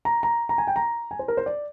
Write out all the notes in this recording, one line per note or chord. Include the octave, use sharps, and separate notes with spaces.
A#5
A#5
A#5
G#5
G5
A#5
G#5
C5
A#4
C5
D5